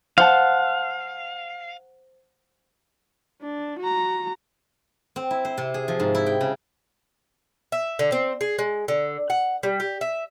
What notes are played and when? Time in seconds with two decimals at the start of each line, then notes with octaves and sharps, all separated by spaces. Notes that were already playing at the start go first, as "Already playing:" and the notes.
0.18 C5 F5 F#5 A5
3.42 D4
3.79 F#4 A#5
5.16 C4
5.31 E4
5.45 C5
5.58 C3
5.74 G#4
5.88 F3
6.00 G#2
6.15 E4
6.26 G5
6.41 C#3
7.72 E5
7.99 D3
8.12 C4
8.41 G#4
8.59 G#3
8.88 D3
9.30 F#5
9.63 G3
9.80 G4
10.01 E5